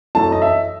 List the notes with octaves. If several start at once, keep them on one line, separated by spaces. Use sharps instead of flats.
F#2 E3 A3 A5
D#5
E5